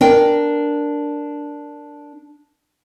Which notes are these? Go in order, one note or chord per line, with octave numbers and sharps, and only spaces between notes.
D4 A#4 G5